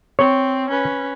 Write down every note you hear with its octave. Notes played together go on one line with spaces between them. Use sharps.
C4 C#5
C#4 B4